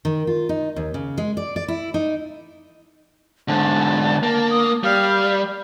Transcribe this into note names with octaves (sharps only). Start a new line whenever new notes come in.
D#3
F4
D#4
D#2
C#3
G#3
D5
D5
E4
D#4
G#2 D3 A5
A#3
D#6
G3 F5